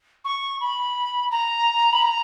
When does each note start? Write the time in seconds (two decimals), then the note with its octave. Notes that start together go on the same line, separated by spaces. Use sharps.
0.25 C#6
0.61 B5
1.31 A#5
1.93 B5
2.02 A#5